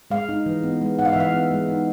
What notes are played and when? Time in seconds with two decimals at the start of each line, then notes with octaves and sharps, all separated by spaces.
0.11 G#3 F5
0.29 D#4
0.46 E3
0.63 B3
0.81 G#3
0.99 D#4 F#5
1.05 F5
1.13 E5
1.16 E3 F5
1.34 B3
1.51 G#3
1.69 D#4